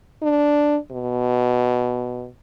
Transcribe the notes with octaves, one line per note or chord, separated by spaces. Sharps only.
D4
B2